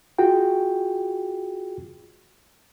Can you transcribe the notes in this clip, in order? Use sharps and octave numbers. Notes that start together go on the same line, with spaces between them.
F4 F#4 G#4 G5